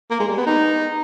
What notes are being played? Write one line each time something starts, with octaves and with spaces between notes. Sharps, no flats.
A#3
G#3
G3
B3
D#4